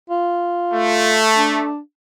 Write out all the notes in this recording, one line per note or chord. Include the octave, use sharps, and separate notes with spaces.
F4
A3
D4